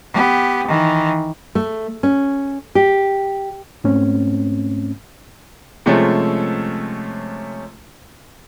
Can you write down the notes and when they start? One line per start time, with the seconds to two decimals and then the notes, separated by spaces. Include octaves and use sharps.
0.14 B3 G4
0.67 D#3 E3
1.55 A3
2.03 C#4
2.75 G4
3.84 G#2 A3 C4 C#4
5.86 C3 F3 G#3 A3 C#4